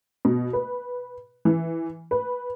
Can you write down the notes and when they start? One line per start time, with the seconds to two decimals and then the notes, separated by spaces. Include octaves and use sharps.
0.25 B2
0.53 B4
1.45 E3
2.11 B4